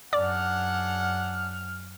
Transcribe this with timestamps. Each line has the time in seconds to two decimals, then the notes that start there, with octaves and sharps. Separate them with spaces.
0.13 F#2 D4 G#4 D5 F#5 D6 F6